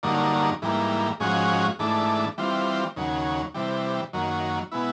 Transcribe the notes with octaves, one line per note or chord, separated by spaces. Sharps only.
G2 D3 F#3 A#3 D#4
G#2 E3 G3 A#3
G#2 F3 G#3 C#4 F#4
G#2 E3 A3 D4
E3 G3 C4 F4
D#2 C#3 F#3
C3 E3 G3
F#2 D#3 F#3 A#3
B2 G#3 B3 E4